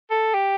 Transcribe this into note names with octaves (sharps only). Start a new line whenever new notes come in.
A4
G4